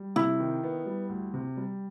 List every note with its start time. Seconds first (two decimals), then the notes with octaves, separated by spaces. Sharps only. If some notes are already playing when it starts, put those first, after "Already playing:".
Already playing: G3
0.16 C3 E4
0.40 D#3
0.64 B3
0.86 G3
1.09 D2
1.34 C3
1.57 G3